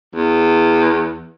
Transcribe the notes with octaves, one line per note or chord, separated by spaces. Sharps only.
E2